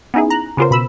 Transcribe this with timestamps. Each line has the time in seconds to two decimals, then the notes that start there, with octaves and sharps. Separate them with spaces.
0.14 B3 C#4 D#4 E4 G#4
0.30 A#5 F#6
0.57 C#3 B3 C#4 F4 A#4 C5
0.71 B2 B5 E6